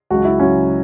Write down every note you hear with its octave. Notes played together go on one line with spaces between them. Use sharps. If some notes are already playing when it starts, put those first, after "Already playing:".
C#2 C#3 F#3 F#4
E4
C#2 C#3 F#3 C#4